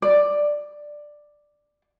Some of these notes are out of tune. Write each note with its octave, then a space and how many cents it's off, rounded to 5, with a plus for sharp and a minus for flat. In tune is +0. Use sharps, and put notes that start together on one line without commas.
D5 +10